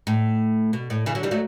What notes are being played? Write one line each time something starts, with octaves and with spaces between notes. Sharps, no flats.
A2
B2
A2
C#3 E3
D3 F#3
E3 G3
F#3 A3